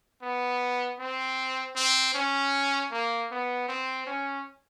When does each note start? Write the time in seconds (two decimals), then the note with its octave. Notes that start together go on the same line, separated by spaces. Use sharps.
0.22 B3
0.99 C4
1.76 C4
2.14 C#4
2.91 A#3
3.31 B3
3.69 C4
4.07 C#4